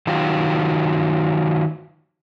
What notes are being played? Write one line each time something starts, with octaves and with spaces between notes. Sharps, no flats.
D#3 F#3 F4 G4